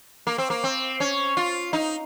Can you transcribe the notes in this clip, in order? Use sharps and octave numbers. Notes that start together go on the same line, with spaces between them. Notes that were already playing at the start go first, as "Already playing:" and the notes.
A#3
C4
A#3
C4
C#4
F4
D#4